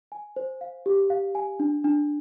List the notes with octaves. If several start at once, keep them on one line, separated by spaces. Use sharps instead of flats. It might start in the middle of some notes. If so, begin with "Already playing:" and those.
G#5
C5
F5
G4
F5
G#5
D4
D4